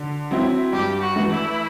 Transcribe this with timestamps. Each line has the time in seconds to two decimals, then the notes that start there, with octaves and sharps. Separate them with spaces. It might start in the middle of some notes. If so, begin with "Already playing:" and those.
Already playing: D3
0.31 F#3 C4 E4
0.73 G2 G4
1.01 F#4
1.16 E3 A3
1.29 E4